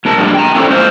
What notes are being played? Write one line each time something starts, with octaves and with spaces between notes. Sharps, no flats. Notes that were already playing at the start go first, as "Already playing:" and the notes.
G#2 C3 A#4 A5
G2 A#2 G3 G#3
G5 A#5
C#4 D4 E4 A4 C5 D5
G#3 A#3 C4 F4 C5